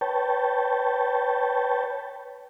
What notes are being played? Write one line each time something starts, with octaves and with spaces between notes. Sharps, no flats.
B4 C#5 G5 A5